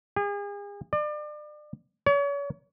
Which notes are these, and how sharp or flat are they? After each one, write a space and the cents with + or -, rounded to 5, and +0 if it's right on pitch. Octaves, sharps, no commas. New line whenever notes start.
G#4 -40
D5 +35
C#5 +40